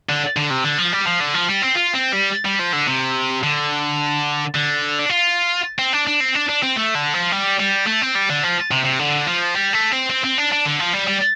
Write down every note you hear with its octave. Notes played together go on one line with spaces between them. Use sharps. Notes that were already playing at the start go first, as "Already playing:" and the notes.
D3
D3
C3
D3
F3
G3
F3
D3
F3
G3
C4
F4
C4
G3
G3
F3
D3
C3
D3
D3
D4
F4
C4
D4
D4
C4
D4
D4
C4
A3
D3
F3
G3
G3
A3
C4
G3
D3
F3
C3
C3
D3
F3
G3
A3
C4
C4
C4
D4
D4
D3
F3
G3
G3